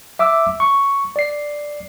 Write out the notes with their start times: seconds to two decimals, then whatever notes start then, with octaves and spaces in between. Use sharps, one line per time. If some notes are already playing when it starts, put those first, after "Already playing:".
0.19 E5 D6 E6
0.60 C#6
1.16 D5 C7